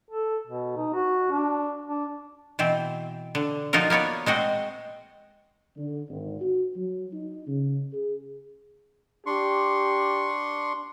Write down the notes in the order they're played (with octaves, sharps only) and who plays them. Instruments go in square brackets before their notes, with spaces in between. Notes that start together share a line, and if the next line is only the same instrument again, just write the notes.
[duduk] A4
B2
D#4
F#4
D4
D4
[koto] B2 E3 C4
D3
F3 D#4 F4 F#4 A#4
A#3 B3 C#5 D5
G#3 C4 F#4 D#5
[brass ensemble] D3
G#1
F#4
F#3
D#4
C#3
G#4
[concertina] D4 C6 C#6 [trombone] G4